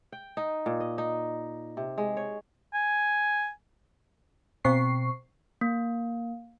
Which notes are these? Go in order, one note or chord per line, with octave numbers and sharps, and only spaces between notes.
G5
D#4
A#2
D#5
D#4
C3
G#3
C#5
G#5
B2 C4 C#6 C7
A#3